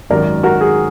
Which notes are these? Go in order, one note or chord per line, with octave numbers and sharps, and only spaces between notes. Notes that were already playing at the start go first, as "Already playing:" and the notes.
G#1 F#2 D#3 F#3 A#4 D5
F#4 A#4
G#4